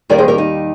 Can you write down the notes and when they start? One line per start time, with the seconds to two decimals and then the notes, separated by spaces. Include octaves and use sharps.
0.09 D#2 D#3 G3 A#4 D5
0.18 G#4 C5
0.28 G4 A#4
0.38 D#4